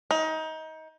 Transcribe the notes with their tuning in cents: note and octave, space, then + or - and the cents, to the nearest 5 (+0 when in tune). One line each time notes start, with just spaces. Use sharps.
D#4 +25